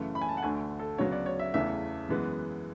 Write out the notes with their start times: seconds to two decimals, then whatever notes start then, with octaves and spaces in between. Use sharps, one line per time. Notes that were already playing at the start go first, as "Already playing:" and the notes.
Already playing: F#2 C#3 E3 A3
0.15 B5
0.22 G#5
0.29 A5
0.37 F#5
0.43 D2 D3 A3 G#5
0.79 A4
0.98 D2 C#3 F#3 B3 C#5
1.12 D5
1.26 C#5
1.39 E5
1.54 E2 C#3 E3 A3 E5
2.09 F#2 E3 G#3 B3